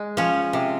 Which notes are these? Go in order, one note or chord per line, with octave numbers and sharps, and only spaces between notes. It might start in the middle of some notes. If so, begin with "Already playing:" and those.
Already playing: G#3
F3 C#4
C3